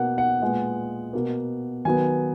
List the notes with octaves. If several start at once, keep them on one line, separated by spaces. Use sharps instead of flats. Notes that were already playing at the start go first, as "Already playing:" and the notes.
Already playing: B2 A#3 F#5
F#5
A#2 G#3 B3
B2 A#3
D#3 F#3 B3 G#5